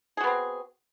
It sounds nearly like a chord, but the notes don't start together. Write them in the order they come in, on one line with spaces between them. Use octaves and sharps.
G#4 F#4 B3 C4